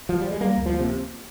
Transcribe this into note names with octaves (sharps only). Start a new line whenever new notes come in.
F3
G3
G#3
G3 A#3
D2
F3
A#3
C3